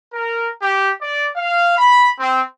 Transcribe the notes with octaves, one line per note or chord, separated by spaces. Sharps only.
A#4
G4
D5
F5
B5
C4